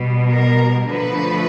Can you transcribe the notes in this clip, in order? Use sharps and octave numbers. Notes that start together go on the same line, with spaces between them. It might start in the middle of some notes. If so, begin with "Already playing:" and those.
Already playing: B2 G3
A#4
D3 F3 A3 B4